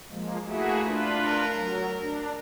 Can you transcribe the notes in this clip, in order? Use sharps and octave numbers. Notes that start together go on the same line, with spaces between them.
F3 G#3 A#3
A3 A#3 E4 F#4 G#4
D4 F4 B4
A#4
F#3
D4